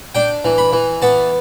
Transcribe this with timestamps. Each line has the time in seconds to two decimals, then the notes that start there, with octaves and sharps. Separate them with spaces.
0.15 D4 G5
0.45 E3
0.58 B5
0.73 E3
1.02 B3 A5